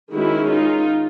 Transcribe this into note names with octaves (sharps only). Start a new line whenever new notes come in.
D#3 G#3 C#4 E4 F#4
D#4 F4